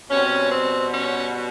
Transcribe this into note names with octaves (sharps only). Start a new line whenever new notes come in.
B2 G3 C4 C#4
C4
C#4